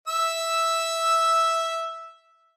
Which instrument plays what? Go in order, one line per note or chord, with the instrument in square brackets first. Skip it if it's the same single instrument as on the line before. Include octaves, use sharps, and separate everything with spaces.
[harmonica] E5 E6